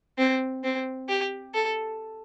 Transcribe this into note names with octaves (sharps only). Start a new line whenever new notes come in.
C4
C4
G4
A4